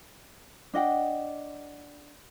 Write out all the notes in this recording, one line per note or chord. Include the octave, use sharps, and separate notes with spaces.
D4 D#5 F#5 G5